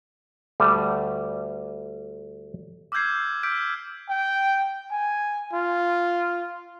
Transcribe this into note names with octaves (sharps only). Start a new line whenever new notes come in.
D2 G3 A3
D6 E6 F6 G6 G#6 C7
D6 E6 F6 G6 B6 D7
G5
G#5
F4